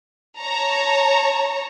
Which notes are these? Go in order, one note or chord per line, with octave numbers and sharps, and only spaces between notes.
C#5 A5 A#5